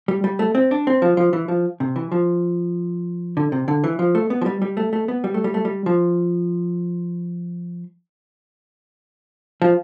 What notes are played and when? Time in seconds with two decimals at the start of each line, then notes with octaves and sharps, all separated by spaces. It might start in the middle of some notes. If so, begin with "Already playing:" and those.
0.08 G3
0.24 G3
0.39 A3
0.55 C4
0.71 D4
0.87 C4
1.02 F3
1.17 F3
1.33 E3
1.48 F3
1.80 C3
1.96 E3
2.12 F3
3.37 D3
3.52 C3
3.68 D3
3.84 E3
3.99 F3
4.15 A3
4.30 B3
4.41 F3
4.46 G3
4.62 G3
4.77 A3
4.93 A3
5.08 B3
5.24 G3
5.34 A3
5.44 G3
5.54 A3
5.65 G3
5.86 F3
9.62 F3